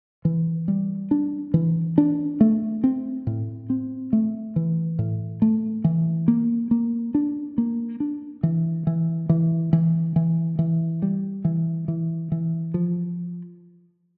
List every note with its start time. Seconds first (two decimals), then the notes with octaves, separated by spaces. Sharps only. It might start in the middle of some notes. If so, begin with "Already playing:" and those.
0.25 E3
0.68 G3
1.11 D4
1.54 E3
1.98 D4
2.41 A3
2.84 C4
3.27 A2
3.70 C4
4.13 A3
4.56 E3
4.99 A2
5.42 A3
5.84 E3
6.28 A#3
6.71 A#3
7.15 D4
7.58 A#3
8.00 D4
8.43 E3
8.87 E3
9.29 E3
9.73 E3
10.16 E3
10.59 E3
11.02 G3
11.45 E3
11.88 E3
12.32 E3
12.74 F3